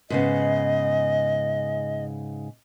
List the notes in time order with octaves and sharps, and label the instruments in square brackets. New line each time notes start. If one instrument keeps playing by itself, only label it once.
[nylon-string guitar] G#2 C#3 B3 [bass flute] D#5